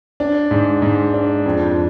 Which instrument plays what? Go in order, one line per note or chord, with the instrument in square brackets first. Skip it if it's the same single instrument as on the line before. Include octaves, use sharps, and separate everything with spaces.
[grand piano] D4
G#2
G#2
D4
F2